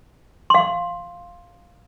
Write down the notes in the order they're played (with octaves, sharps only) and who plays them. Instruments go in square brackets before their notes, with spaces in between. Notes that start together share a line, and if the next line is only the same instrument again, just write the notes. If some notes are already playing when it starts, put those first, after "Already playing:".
[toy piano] F5 C6